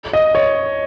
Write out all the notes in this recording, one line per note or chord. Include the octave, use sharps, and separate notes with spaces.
D#5
C#5